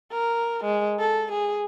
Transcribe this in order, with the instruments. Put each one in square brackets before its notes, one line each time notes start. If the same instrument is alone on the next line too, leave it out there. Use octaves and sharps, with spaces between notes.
[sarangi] A#4
G#3
A4
G#4